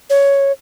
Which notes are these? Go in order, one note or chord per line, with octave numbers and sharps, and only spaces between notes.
C#5